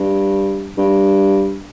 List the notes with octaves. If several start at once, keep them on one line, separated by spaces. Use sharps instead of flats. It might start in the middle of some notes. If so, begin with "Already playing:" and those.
Already playing: G2
G2